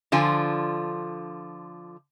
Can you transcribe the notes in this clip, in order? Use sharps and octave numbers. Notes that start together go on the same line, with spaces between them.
D3 F3 F4 G#5